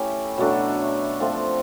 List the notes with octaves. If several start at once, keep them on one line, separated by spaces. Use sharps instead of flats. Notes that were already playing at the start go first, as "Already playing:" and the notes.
Already playing: A3 C#4 E4 G4
B2 F#3 A3 D4
F3 A3 C4 F4